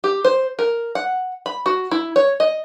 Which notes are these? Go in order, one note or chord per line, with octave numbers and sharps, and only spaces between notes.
G4
C5
A#4
F#5
B5
F#4
E4
C#5
D#5